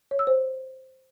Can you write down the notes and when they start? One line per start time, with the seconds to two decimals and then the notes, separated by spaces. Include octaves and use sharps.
0.11 C#5
0.19 E6
0.27 C5